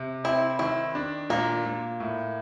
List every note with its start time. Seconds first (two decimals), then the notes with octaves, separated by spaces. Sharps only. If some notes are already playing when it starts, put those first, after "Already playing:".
Already playing: C3
0.24 C4 E4
0.59 D#3 E4
0.95 D4
1.30 A#2 A#3
1.65 A#2
2.00 A2